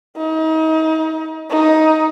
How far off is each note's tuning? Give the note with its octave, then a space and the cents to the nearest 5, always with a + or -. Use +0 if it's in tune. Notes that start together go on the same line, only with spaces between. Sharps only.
D#4 +35
D#4 +15